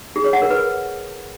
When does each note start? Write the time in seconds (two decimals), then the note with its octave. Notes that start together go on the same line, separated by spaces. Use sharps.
0.16 G#4
0.24 C#5
0.33 F#5
0.42 A#4
0.50 B4